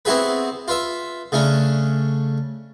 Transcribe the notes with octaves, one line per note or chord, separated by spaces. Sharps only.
B3 C4 E4 F#4 G#4 B4
F4 B4 E5
C#3 A3 C#4 D4